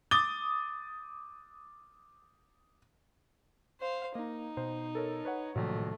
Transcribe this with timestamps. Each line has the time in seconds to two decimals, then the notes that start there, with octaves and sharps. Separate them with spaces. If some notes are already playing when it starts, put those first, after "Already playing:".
0.11 D6 D#6 A6 G7
3.80 C5 F5
4.15 A#3 D#4
4.57 B2 C5
4.95 A4 A#4 C#5
5.25 B4 C#5 F#5
5.56 A#1 A2 C3 D#3 F#3 A3